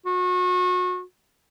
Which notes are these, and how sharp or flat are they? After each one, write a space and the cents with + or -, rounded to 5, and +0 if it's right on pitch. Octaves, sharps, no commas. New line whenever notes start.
F#4 -30